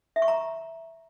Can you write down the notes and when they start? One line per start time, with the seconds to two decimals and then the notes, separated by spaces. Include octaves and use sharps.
0.16 E5
0.22 C#6
0.28 A#5